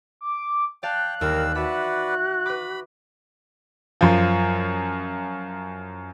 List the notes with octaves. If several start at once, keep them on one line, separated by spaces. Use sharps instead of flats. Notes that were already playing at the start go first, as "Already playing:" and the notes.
D6
D5 F5 G5 A5 F#6
D#2 G3 A#4 F5 E6
F#4 B4 D5 E5 F#5
B4 B5 D6
F#2 F3